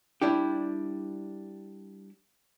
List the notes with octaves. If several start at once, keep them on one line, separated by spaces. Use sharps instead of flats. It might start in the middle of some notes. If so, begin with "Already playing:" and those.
G3 D4 E4 G4